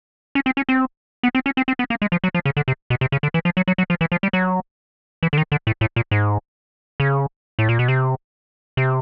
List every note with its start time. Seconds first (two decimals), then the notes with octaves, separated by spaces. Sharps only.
0.35 C#4
0.46 C4
0.57 C#4
0.69 C4
1.23 B3
1.35 C4
1.46 C#4
1.57 C4
1.68 C4
1.79 B3
1.90 A#3
2.02 G#3
2.12 F3
2.24 F#3
2.35 F3
2.45 C#3
2.57 D3
2.68 C3
2.90 B2
3.01 C3
3.12 C#3
3.23 D3
3.34 E3
3.45 F3
3.57 F#3
3.68 F#3
3.78 F#3
3.90 F3
4.01 E3
4.12 F3
4.23 G3
4.33 F#3
5.23 E3
5.33 D3
5.38 D#3
5.52 D3
5.67 A2
5.81 A2
5.96 A#2
6.11 G#2
7.00 C#3
7.59 A2
7.69 A#2
7.79 B2
7.88 C3
8.77 C3